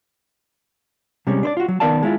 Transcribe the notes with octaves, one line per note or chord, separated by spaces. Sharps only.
C3 G3 G#3 C#4
D4 C5 D5
F4 F#4
F#3
D#3 B3 A#4 D5 F5 A5
G#3 E4 F4